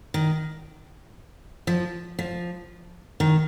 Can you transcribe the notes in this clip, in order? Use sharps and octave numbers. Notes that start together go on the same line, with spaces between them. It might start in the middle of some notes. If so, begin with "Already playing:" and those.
D#3
F3
F3
D#3